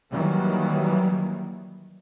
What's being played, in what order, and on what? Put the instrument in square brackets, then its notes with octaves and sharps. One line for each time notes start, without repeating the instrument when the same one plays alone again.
[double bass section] D#3 E3 F#3 G3 A#3